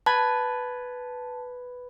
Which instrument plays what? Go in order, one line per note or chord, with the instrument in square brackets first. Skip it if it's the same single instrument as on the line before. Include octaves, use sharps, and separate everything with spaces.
[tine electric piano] B4 B5 G#6 [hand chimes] A5